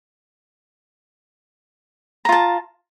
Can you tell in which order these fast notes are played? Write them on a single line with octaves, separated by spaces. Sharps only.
A#5 F4 A5